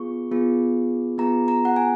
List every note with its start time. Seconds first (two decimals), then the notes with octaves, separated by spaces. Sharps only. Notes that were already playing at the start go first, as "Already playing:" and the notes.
Already playing: B3 F4 G#4 C#6
0.31 B3 F4 G#4
1.18 B3 F4 G#4 A#5
1.48 A#5
1.65 F#5
1.76 G#5